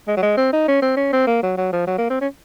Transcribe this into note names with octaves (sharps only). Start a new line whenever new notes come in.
G#3
F#3
G#3
C4
D#4
C#4
C4
C#4
C4
A#3
F#3
F#3
F3
F#3
A#3
C4
C#4